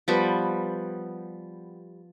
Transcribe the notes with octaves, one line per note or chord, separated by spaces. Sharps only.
F3 G3 B3